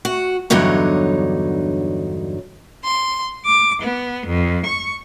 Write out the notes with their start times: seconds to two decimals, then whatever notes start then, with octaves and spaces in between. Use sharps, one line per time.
0.05 F#4
0.50 E2 G2 D3 F#3 D#4 C#5
2.84 C6
3.45 D6
3.82 B3
4.26 F2
4.65 C#6